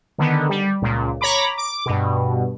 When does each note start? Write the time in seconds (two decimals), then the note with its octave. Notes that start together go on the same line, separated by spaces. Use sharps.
0.18 D3 D#3 B3
0.49 G3
0.82 C#2 A#2
1.21 C#5 A#5 B5 D6
1.58 D6
1.86 G2 B2